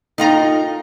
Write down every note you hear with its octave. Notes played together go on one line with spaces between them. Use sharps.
D#4 F4 A4 A#4 G5